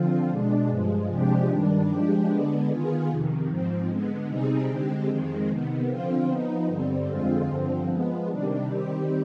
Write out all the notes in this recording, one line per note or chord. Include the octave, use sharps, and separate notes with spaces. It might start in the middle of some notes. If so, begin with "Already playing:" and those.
Already playing: D3 F3 C4 F4
B2 G#3 D4
G2 F3 G#3
C3 F3 G#3 D4 G4
G2 D#3 G3 D4
F3 G#3 D4 G4
D3 G#3 B3 D4
D#3 B3 F4 G#4
F2 C3 D#3
G#2 F3 C4
D3 G#3 B3
C3 G3 C4 D#4 G#4
D3 G#3 C4 G4
F2 D#3 G#3 C4
C3 D#3 B3
D3 F3 C4 F4
F3 B3 D#4
G2 D3 G3 C4
F2 D3 G#3 C4 F4
G2 D3 F3 C4
F3 G#3 B3
C3 D#3 G3 D4
D#3 G3 C4 G4